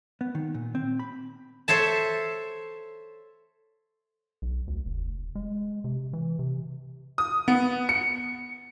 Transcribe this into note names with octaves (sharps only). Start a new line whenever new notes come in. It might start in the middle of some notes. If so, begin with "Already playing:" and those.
B3
D#3
A#2
C4
B5
A4 C5 C#5 E5 A5
B1
D2
F1
G#3
C3
E3
C3
D#6
B3
C#7